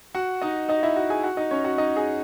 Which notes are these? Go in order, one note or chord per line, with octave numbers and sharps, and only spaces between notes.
F#4 F#5
D#4 D#5
D#4 D#5
E4 E5
F#4 F#5
G#4 G#5
F#4 F#5
D#4 D#5
C#4 C#5
F#4 F#5
D#4 D#5
G#4